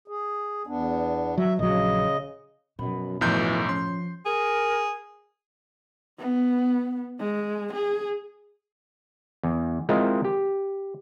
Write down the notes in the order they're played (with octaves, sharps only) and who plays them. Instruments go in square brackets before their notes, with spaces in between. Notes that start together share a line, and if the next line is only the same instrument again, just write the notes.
[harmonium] G#4
E2 B3 D4
[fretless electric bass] F#3 [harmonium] E5
[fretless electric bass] A#1 F#3 [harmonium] C#3 D#5
[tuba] F#2 [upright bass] B2 F3 [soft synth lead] B5
[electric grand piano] B1 F#2 G6 [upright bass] A2 D3 [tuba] E3 [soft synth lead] F3
[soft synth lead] F3 [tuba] C#4 [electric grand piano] C6
[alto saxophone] G#4 [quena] A#4
[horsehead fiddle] B3
G#3
G#4
[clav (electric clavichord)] E2
G#3 C4 E4 F4 A#4 D#5
G4